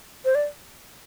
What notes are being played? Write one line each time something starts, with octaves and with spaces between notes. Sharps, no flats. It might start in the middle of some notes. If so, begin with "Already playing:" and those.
C5
D5